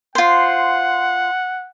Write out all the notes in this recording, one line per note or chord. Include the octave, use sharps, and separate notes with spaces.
F4 C5 F#5